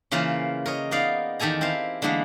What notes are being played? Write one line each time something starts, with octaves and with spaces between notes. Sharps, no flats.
C#3 E3 A#3 F4 A#4 C5
A#4 C#5 D#5
B3 D#4 A#4 D5 F5
E2 D#3 G4 A4 G#5 A#5
C4 E4 A#4 F5
D3 E3 G#3 A#3 B3 D4